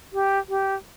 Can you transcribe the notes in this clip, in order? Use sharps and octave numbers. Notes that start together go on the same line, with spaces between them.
G4
G4